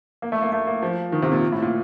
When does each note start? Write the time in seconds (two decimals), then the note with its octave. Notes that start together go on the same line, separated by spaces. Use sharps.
0.22 A#3
0.32 A3
0.42 A#3
0.52 A3
0.67 A#3
0.83 F3
1.12 D#3
1.22 C3
1.32 A#2
1.52 A2
1.62 A#2